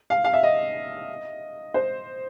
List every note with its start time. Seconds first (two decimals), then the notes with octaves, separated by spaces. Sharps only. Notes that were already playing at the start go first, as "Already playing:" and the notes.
0.10 F5
0.24 F5
0.33 E5
0.43 D#5
1.74 C5